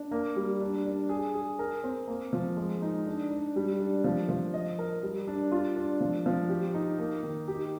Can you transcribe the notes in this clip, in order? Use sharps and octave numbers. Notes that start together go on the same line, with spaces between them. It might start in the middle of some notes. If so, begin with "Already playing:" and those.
Already playing: D4
A#3
G3
D4
D4
G#4
G#4
A#4
C4
A#3
F3
G#3
D#4
D4
D4
G3
D4
F3
F3
D#5
A#4
G3
D4
F4
D4
F3
F3
G4
D#4
A#3
D#3
G4